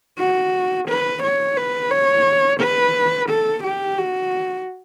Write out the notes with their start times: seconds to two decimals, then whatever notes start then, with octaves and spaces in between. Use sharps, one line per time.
0.19 F#4
0.89 B4
1.23 C#5
1.57 B4
1.91 C#5
2.61 B4
3.30 A4
3.64 G4
3.98 F#4